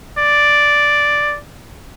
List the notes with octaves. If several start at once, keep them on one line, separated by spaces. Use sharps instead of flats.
D5